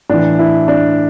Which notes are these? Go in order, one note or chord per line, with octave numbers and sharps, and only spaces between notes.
A2 E3 D4
E4
D4